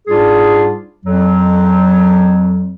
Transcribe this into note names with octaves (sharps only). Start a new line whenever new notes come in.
G#2 G3 D4 F4 G#4
F2 F#3